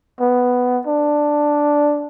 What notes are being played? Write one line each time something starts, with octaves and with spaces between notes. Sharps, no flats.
B3
D4